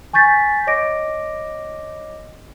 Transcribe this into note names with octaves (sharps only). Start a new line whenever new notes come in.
G#5 C#6 G6 A6 B6
C#5 D#5 D6 A#6 D7